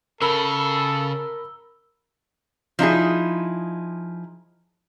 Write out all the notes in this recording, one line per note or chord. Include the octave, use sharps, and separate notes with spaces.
C#3 A4 A#4 B5 E6 G7
F3 D#4 E4 G#4